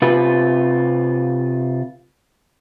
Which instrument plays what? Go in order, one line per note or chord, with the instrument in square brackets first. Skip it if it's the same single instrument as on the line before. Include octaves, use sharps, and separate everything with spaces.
[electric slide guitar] C3 F4 B4